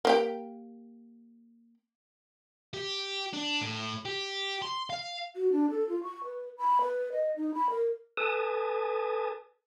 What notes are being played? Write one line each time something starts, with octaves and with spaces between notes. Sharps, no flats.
A#3 G4 G5
G4
D4
A2
G4
C6
F5
F#4
D4
A4
F4
C#6
B4
B5
B4
D#5
D#4
B5
A#4
A4 B4 G#5 A5 D#6